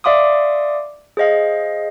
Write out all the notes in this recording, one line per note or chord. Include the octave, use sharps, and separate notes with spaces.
D5 E5 F5 C6 D6 D#6
G#4 C5 D#5 F5